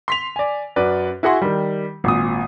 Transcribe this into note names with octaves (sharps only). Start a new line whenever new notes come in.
C6 B6 F7
D5 G#5
F#2 B4 D5
E4 F#4 G#4 F#5 C6
D#3 G3
G#1 A#2 D#6